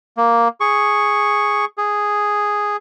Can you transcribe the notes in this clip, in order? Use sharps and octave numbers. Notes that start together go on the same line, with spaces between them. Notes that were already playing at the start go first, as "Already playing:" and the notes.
A#3
G#4 C#6
G#4